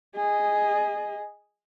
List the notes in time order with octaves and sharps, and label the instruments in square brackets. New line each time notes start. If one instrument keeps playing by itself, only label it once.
[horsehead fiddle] G#4 D#5